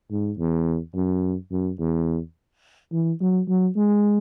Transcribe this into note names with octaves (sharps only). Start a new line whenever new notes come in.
G#2
E2
F#2
F#2
E2
E3
F#3
F#3
G#3